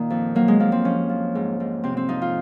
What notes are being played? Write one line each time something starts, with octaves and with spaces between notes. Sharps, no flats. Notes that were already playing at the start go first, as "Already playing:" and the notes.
Already playing: A#2 D#3 A#3 D#4
F2
F#3 A#3
G#3
F2 A#3
C4
F3 C#4
F3
G#2
G#2
C3 C4
C4
F2 D#4
F4